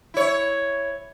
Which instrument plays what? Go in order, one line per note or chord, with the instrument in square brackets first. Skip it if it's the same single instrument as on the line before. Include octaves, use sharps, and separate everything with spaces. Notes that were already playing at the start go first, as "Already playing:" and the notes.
[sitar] E4 C#5